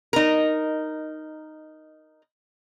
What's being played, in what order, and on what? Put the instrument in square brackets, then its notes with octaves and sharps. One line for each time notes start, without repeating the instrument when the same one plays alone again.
[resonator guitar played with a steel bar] D#4 A#4